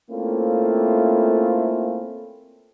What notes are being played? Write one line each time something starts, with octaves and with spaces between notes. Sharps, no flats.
A3 A#3 C4 C#4 E4 F4